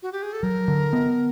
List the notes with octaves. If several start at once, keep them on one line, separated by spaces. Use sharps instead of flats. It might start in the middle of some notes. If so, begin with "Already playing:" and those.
F#4
G4
G#4
A4
F#3 A#4
D3
B3